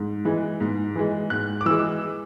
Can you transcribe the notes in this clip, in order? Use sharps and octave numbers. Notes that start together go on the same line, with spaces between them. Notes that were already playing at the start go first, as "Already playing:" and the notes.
Already playing: G#2
E3 G#3
G#2
E3 G#3
G#2 F#6
D6
E3 G#3 E6